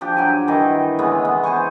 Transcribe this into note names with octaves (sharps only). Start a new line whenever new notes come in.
F3 D4 G4
G2 F#3 G5 G#5
D#3 E3
C#3 E3 G#3 B3
B3
C5 G#5 C6 C#6